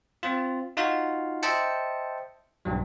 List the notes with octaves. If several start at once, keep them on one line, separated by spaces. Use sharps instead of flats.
C4 F4
D#4 F4 F#4 F5
C5 D#5 E5 G5 A5 C#7
B1 G2 F#3